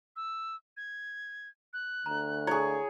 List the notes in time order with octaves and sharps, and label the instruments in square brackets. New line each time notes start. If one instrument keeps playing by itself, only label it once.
[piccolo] E6
G#6
F#6
[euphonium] D2 [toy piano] A#5
[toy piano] E4 [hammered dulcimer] G#4 C#5